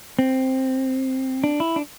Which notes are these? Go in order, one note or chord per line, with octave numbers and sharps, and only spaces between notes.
C4
D4
E4
D4